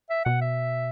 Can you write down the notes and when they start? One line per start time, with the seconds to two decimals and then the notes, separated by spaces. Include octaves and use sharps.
0.10 E5
0.25 B2 F#5
0.41 E5